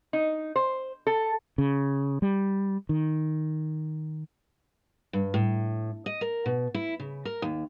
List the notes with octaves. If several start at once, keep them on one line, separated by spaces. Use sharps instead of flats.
D#4
C5
A4
C#3
G3
D#3
G2
A2
D#5
A#4
B2
E4
C#3
A#4
D#2